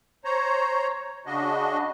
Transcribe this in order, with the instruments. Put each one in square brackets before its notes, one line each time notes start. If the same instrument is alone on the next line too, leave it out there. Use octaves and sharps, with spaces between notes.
[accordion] C5 C#5 A#5
C#3 D4 F#4 D#5